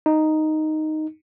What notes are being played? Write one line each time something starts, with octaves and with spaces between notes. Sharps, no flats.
D#4